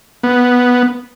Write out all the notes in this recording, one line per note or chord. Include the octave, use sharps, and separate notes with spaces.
B3